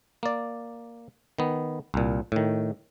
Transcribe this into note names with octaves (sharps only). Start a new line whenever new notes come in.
A#3 D5
D#3 B3
C2 A#2
A2 D#3